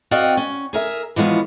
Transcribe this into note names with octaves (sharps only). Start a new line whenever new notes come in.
C4 F#4 D5 D#5 F5 G5
C#4
G#4 A#4 E5
E3 F3 G#3 B3 C#4